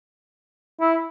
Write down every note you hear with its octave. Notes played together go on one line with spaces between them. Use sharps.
E4